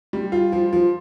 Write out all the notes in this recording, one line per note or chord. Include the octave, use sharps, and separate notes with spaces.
G3
F4
F3
F3